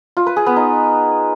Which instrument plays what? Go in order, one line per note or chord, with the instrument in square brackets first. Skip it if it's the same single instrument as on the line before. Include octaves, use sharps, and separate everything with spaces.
[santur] F4
B4
G#4
B3
D#4